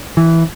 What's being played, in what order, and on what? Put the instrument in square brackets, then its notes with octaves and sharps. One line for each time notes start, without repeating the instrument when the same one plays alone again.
[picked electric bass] E3